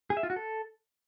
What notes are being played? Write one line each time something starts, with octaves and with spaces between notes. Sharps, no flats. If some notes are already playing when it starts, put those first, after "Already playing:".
G#4
E5
F4
F#4
A4